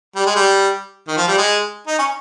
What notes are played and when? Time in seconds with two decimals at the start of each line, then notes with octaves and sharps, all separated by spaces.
0.16 G3
0.26 G#3
0.36 G3
1.08 D#3
1.17 F3
1.28 G3
1.38 G#3
1.87 D#4
1.99 C#4